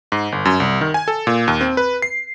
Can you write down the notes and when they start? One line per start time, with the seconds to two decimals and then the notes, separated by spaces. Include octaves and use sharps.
0.12 G#2
0.32 G1
0.45 F#2
0.60 C2
0.81 D#3
0.94 G#5
1.08 A4
1.27 A#2
1.48 D#2
1.61 C4
1.77 B4
2.02 C7